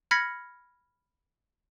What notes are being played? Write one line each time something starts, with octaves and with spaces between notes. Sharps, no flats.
B5 F6 G#6 A#6 B6 C#7